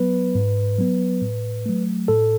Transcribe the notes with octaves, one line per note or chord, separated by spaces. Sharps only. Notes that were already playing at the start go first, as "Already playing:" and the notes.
Already playing: F#3 B3 B4
G#2
F#3 B3
A2
F#3 A3
A2 A4